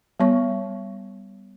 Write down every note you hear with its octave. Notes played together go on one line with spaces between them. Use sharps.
G3 B3 C#5 C#6